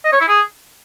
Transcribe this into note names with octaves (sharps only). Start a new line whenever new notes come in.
D#5
C#5
E4
G#4